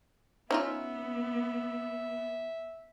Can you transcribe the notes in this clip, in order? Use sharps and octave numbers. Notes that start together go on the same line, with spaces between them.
B3 C#4 D#4 F4 E5